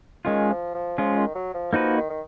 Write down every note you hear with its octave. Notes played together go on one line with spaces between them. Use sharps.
D#3 G#3 C#4 F4
F3
F3
F3 G#3 C#4 F4
D#3
F#3
F3
F3 A#3 D#4 F#4 B4
D#3
D#3